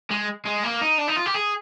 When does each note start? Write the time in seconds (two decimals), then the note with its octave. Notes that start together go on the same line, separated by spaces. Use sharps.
0.10 G#3
0.45 G#3
0.63 A#3
0.81 D#4
0.98 D4
1.08 D#4
1.17 F4
1.26 G4
1.35 G#4